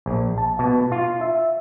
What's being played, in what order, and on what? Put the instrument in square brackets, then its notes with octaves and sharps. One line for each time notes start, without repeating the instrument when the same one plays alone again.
[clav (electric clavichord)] A#1
A5
B2
F4
E5